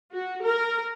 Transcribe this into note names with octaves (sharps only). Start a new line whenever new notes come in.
F#4
A#4